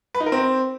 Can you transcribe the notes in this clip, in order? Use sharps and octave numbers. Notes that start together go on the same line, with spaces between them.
B4
D#4
A#4
C4